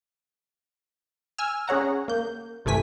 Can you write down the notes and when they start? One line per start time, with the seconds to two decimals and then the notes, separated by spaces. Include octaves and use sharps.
1.38 G#5 E6 F6
1.68 C#4 G#4 C#5 F#5 A#5
2.08 A#3 G6
2.65 G1 C3 E3 A3 G#5 B6